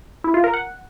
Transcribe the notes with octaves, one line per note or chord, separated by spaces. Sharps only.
E4
F4
A#4
F#5